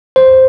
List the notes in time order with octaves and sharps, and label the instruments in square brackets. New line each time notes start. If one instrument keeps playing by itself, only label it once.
[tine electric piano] C5